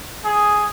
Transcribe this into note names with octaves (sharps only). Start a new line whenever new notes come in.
G#4